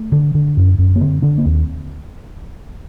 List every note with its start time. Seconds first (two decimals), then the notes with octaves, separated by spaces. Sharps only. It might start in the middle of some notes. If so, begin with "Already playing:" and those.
Already playing: A3
0.12 D3
0.35 D3
0.57 F#2
0.78 F#2
0.96 A#3
1.01 D3 C4
1.22 D3 D4
1.38 A#3
1.45 D#2 C4